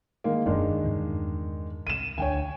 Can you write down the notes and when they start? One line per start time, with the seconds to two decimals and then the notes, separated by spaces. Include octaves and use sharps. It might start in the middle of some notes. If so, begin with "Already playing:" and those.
0.24 D#3 G#3 A#3
0.46 E1 F#2 D#3 G#3 D4
0.84 E2 G2 C#3
1.87 C2 D#7 E7
2.18 D2 A3 D4 C#5 G5 G#5